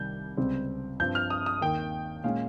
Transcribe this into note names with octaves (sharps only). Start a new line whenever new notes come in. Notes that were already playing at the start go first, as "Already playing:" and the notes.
Already playing: C2 C3 D#3 G3 G6
C#2 C3 G3 C4
G2 F3 C4 G6
F6
D#6
D#6
D#2 D#3 A#3 G5
A#2 G#3 C#4 F5